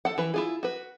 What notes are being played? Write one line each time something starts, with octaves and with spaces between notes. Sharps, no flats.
A4 F#5
E3 B4
E4 F4 G#4
F#4 B4